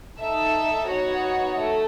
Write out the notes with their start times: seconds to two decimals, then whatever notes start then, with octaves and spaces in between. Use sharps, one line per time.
0.20 D#4 A4 E5
0.88 B3 D#4 F#4 C#5
1.57 A3